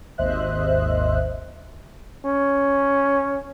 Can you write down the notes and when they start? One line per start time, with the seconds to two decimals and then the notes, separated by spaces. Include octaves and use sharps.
0.18 G#1 D#2 C5 D#5 E5 F#6
2.26 C#4